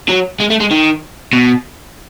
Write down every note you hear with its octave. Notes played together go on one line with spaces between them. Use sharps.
F#3
G#3
A3
G#3
D#3
B2